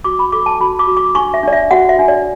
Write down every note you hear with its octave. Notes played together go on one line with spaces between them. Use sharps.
F#4 D6
B5
A4 D6
A5
F#4 B5
D6
F#4
D6
D4 C#6
E5
D4 D5
E5
F#4 F#5
E5
D4
D5